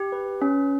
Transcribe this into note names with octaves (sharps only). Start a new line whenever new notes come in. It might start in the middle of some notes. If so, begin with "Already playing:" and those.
Already playing: G4
B4
C#4